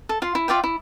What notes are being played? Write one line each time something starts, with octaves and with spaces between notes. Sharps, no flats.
A4
F4 C6
E4
F4 D5 E5 G5
E4